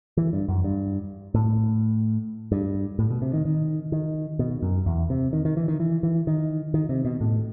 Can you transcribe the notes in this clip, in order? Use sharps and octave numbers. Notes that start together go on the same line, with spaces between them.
E3
G2
F#2
G2
A2
G2
A2
B2
C3
D#3
D#3
D#3
B2
F#2
E2
C3
D#3
D#3
E3
D#3
E3
E3
D#3
D#3
C3
B2
A2